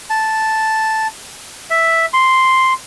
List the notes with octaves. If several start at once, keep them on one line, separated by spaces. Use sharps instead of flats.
A5
E5
C6